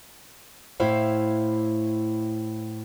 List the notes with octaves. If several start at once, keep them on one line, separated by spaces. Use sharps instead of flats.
A2 E4 C5 F5